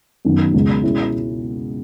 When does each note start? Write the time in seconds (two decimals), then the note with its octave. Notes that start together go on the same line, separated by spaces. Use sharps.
0.25 F#2 D#3 F#3 B3
0.54 C#2 B2 G#3
0.83 B2 G#3 C#4 E4